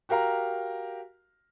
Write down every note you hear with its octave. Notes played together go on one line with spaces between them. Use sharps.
F#4 G4 A#4 F5 A#5